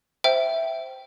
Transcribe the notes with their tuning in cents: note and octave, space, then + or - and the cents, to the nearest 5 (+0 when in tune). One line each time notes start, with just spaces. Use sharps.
C5 +0 E5 +0 G5 -20